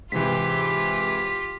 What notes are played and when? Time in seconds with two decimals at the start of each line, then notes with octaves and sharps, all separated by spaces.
0.12 G#2 C3 E3 F4 G4 B6